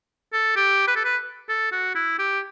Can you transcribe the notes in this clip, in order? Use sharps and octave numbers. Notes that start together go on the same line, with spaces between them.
A4
G4
B4
A4
B4
A4
F#4
E4
G4